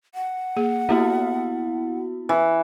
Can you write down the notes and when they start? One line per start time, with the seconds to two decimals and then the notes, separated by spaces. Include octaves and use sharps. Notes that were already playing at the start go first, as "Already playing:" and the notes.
0.15 F#5
0.56 A#3 G#4
0.89 A#3 B3 E4 F#4 G4
2.29 E3